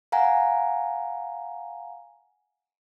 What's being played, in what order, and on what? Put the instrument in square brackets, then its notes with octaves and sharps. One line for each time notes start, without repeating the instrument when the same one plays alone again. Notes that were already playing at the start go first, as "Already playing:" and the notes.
[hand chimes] F5 F#5 G#5 A#5